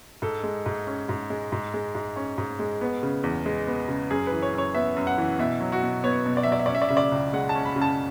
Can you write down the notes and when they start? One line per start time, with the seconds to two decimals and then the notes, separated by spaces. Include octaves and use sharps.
0.22 G#2 A4
0.43 G#3
0.66 G#2
0.87 C#4
1.09 G#2
1.30 G#3
1.52 G#2
1.74 G#3
1.95 G#2
2.16 C#4
2.38 G#2
2.59 G#3
2.81 B3
3.03 C#3
3.23 E2
3.46 G#3
3.67 B3
3.88 C#3
4.10 F#2 G#4
4.27 B4
4.32 E3
4.42 C#5
4.53 F#2 C#5
4.74 B3 E5
4.96 F#2
5.07 F#5
5.18 E3
5.39 B2 E5
5.61 F#3
5.72 F#4
5.83 B2
6.04 B3 C#5
6.26 B2
6.37 D5
6.43 E5
6.47 F#3
6.52 D5
6.59 E5
6.66 C#4 D5
6.75 E5
6.82 D5
6.89 C#3 E5
6.97 D5
7.12 C#2
7.33 G#3 F#5
7.49 A5
7.55 C#4
7.65 B5
7.76 C#3
7.81 A5